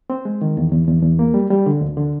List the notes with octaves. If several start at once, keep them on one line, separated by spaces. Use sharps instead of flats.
C4
G#3
D#3
E2
E2
E2
E2
A#3
G3
G3
D3
D2
D3